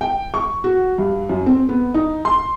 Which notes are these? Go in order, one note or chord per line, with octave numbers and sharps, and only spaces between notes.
G5
C#6
F#4
G2
F#2
C4
B3
D#4
C6